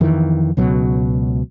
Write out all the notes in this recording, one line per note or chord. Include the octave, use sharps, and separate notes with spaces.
F2 D#3 E3
C#2 B2 F#3